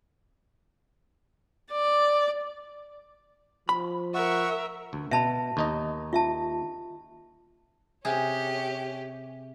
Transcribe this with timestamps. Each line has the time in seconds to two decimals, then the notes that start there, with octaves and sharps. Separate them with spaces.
1.72 D5
3.69 F3 B5
4.14 A#4 E5 F#5 C#6
4.93 D2
5.11 B2 E5 A5 B5
5.57 D#2 D#4 D#5
6.13 F4 E5 A5
8.05 C3 C#4 G4 G#4